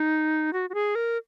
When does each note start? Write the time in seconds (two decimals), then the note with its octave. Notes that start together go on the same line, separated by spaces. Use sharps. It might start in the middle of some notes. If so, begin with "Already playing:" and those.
Already playing: D#4
0.53 F#4
0.70 F#4
0.74 G#4
0.95 A#4